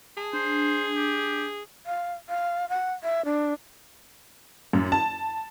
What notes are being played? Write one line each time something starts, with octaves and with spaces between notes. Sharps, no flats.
G#4 A5
D4 C5
G4
F5
F5
F#5
E5
D4
F#2
A5